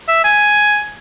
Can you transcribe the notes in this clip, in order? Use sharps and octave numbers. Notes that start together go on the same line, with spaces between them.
E5
G#5